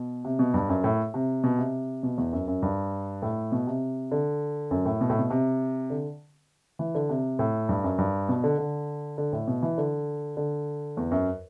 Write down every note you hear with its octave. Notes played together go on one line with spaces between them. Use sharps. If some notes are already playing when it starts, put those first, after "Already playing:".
Already playing: B2
C3
B2
G2
F#2
A2
C3
B2
C3
B2
E2
F#2
F#2
G2
A2
B2
C3
D3
F#2
A2
B2
A2
B2
C3
D3
E3
D3
C3
A2
G2
F#2
G2
B2
D3
D3
D3
A2
B2
E3
D3
D3
E2
F#2